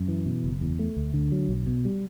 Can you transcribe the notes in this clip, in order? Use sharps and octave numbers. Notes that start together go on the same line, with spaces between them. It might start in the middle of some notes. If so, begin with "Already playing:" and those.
Already playing: F#2
E3
B2
F#1
E2
A3
D2
D3
F#3
B1
B2
G3